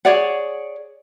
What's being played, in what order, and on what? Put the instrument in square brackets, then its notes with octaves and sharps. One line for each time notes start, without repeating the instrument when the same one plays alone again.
[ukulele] G#4 C#5 D5 F#5